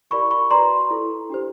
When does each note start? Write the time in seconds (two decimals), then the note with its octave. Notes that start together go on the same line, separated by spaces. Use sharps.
0.11 E4 G4 A#4 D5 B5 C#6
0.31 B5 C#6
0.51 F#4 B4 D5 A#5 C6
0.90 E4 A4 C5
1.30 D4 G4 C5